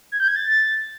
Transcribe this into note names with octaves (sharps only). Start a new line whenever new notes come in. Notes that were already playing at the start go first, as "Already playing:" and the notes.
G#6
G6
G#6
A6